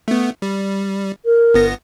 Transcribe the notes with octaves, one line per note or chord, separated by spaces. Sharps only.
A3 B3
G3
A#4
G1 B3 A#6